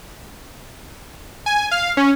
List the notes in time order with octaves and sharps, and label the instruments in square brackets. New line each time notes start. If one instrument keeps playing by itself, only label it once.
[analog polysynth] G#5
F5
C#4